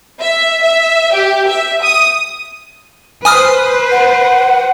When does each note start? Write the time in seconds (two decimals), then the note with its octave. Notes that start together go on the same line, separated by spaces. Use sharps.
0.21 E5
0.62 E5
1.13 G4
1.49 E5
1.83 D#6
3.25 B4 C5 G#5 D#6 F6
3.91 F#5